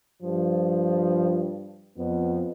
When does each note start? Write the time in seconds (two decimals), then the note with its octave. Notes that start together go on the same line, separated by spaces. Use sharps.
0.22 G2 F3
1.98 F2 B3